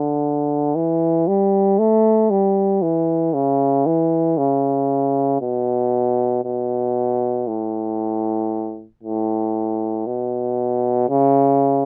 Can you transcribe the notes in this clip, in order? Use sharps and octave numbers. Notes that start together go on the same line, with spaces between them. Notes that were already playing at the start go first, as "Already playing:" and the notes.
Already playing: D3
E3
G3
A3
G3
E3
C#3
E3
C#3
B2
B2
A2
A2
B2
C#3